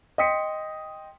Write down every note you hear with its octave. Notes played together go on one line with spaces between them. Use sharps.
D#5 G5 C6 D#6 B6 C#7